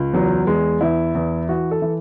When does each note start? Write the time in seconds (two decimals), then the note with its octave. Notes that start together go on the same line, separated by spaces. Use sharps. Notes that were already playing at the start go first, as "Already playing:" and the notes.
Already playing: C#2
0.13 E2 F#3
0.47 E2 G#3
0.81 E2 E4
1.15 E2
1.49 E3 F#4
1.71 A4
1.82 E3